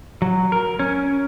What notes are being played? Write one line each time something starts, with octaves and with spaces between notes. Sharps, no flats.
F#3
A#4
C#4